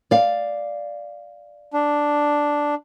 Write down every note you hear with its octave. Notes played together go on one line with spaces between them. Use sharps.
D5 F5
D4